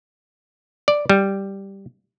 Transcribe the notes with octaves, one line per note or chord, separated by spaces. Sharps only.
D5
G3